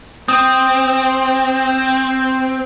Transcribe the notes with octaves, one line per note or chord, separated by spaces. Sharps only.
C4 D#6